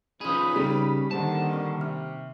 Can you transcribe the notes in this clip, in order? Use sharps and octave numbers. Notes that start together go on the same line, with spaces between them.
F3 C#4 D#4 G#4 B4 B5 D#6
C#3 G3 B6
D3 D#3 A#3 C5 F#5 A5
C4 C#6
C3 E5 F6